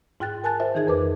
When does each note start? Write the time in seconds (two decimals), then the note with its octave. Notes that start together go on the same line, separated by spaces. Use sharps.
0.20 G#2 F4 G5 F#6 A6
0.44 A#4 G#5 A5 F#6 A6
0.60 F4 C5 E5
0.74 D#3 E3 D#4 G#4 G#6
0.87 F2 A#4 B4 D6